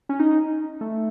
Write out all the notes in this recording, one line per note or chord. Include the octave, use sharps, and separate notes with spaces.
C#4
D#4
A3